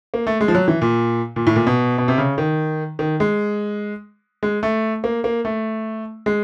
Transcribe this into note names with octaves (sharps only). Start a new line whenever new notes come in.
A#3
A3
G#3
F3
F#3
E3
A#2
A#2
A2
A#2
B2
B2
C3
C#3
D#3
D#3
G#3
G#3
A3
A#3
A#3
A3
G#3